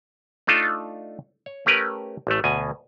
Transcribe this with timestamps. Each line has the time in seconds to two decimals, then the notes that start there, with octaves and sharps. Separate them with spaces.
0.47 A3 D4 D#4 F4 A4
1.46 C#5
1.66 A3 C#4 G4 A#4 B4
2.27 A1 A3
2.44 D2 B2 G#5